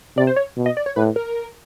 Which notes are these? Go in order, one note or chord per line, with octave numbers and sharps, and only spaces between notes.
C3 D5
C5
C#5
B2
D#5
D5
C#5
A2 B4
A#4